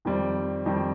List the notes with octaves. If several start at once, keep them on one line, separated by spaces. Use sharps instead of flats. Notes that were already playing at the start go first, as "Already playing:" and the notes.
F2 D#3 G3 C4
F2 D#3 G3 C4